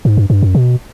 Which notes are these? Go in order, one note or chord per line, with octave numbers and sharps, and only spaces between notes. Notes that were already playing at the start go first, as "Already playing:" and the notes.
G#2
G2
G2
F#2
B2